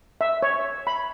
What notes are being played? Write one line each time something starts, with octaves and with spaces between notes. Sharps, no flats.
E5
C#5
B5